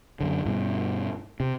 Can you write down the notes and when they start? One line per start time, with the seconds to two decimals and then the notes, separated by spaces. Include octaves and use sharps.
0.21 F#2 D3
0.45 G2 B2
1.40 C3